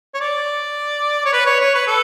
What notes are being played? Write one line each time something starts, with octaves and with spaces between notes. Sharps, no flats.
C#5
D5
C#5
B4
C#5
C#5
B4
A4